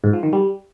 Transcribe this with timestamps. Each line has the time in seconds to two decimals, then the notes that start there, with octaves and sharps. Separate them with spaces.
0.04 G#2
0.13 F3
0.23 D#3
0.33 G3